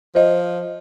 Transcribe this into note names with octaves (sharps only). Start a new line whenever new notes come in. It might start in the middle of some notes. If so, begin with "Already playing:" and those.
F3 C5 D#5